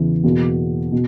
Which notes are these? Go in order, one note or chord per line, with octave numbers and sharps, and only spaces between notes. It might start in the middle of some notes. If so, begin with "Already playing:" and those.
Already playing: E2 C#3 E3
E2 B2 A#3
B2